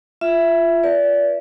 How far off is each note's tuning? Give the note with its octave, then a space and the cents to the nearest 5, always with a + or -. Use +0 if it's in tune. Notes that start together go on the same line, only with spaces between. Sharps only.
F4 -20 E5 +10
B4 -20 D5 -30